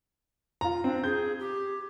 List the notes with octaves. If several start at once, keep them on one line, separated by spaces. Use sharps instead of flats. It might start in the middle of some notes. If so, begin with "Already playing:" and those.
F4 A#5
C4 D4
G#4 G6
G4